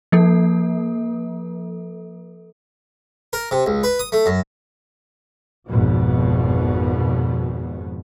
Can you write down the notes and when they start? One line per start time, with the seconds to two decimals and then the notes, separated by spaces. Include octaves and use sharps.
0.12 F3 A#3 A4
3.33 A#4
3.51 C3
3.66 C#2
3.83 B4
3.99 D#6
4.12 A3
4.26 F#2
5.67 G#1 F2 B2 F3